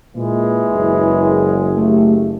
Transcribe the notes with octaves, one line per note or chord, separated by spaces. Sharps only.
A#2 E3 G#3
F#1
A3 G4